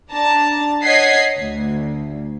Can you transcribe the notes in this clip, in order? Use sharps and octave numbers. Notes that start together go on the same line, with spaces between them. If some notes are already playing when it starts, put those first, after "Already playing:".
D4 A5 A#5
C#5 D#5 F#5 G#6 B6 C7
D2